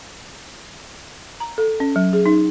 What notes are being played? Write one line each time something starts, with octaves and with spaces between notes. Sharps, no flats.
A#5
A4
C#4
F#3
G#4
D#4